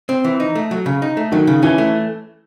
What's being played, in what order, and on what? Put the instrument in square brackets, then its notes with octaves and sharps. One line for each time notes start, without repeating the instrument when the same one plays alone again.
[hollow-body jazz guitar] C4
E3
D#4
A3
F#3
C#3
D#4
A3
[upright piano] D#3 [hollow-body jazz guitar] F#3
[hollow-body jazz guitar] C#3
[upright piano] E3 [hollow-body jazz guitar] C#4
[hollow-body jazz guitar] A3